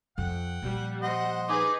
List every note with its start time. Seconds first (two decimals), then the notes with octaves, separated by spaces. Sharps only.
0.18 F2 F#5 G5
0.62 A#2 F3 G3
1.02 C5 D#5 F#5
1.48 D#4 G#4 B4 D6